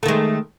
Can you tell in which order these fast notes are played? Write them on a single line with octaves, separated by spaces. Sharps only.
A3 D#3 G#3